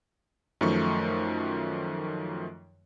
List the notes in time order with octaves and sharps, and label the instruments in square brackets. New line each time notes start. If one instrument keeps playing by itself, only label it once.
[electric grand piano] F#2 D#3 F3 A3 C#6